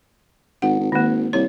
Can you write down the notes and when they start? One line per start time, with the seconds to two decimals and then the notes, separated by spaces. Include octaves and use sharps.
0.62 G#1 F#5
0.79 G#1
0.92 G#1 D#3 A#3
1.33 C2 C#5